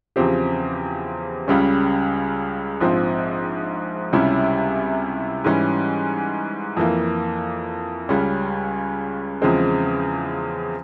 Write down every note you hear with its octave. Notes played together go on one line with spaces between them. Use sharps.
E2 C#3 F3 C4 G4
C#2 C#3 G3 C#4
A#1 G#2 F3 C4
C#2 C3 G3 C#4 E4
G#2 E3 G3 C#4
F2 E3 A#3
C#2 C#3 G3 C#4
E2 C#3 F3 G#3 C4